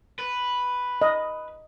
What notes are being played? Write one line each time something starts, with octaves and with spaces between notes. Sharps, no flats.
B4
D#5